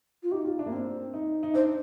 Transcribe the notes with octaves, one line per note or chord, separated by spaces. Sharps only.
F4
D#4 G4
F4
D4
A#3
C4
D#4
D#4
D4 C5